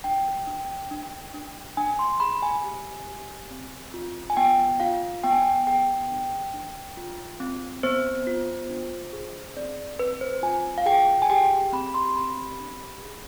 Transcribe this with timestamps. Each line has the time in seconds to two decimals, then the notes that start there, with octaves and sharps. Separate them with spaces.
0.04 D4 G5
0.47 D4
0.91 D4
1.34 D4
1.77 D4 G#5
1.99 C6
2.20 G#4 B5
2.43 G#5
2.64 G4
3.07 G4
3.50 C4
3.94 F4
4.30 G#5
4.37 B3 G5
4.80 F4 F5
5.24 B3 G5
5.33 G#5
5.42 G5
5.67 G#4 G5
6.11 D4
6.54 D4
6.97 F4
7.40 C4
7.83 B3 C5
8.27 F4
8.70 D4
9.13 G#4
9.56 C4 D5
9.99 C4 B4
10.21 C5
10.43 F4 G#5
10.78 F5
10.86 G#4 G5
11.22 G#5
11.30 G4 G5
11.73 C4 B5
11.94 C6
12.16 G4 B5
12.60 D4
13.03 G#4